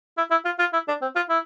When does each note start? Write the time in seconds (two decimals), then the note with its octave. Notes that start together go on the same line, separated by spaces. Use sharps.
0.18 E4
0.31 E4
0.45 F4
0.59 F4
0.73 E4
0.88 D4
1.02 C4
1.15 F4
1.29 E4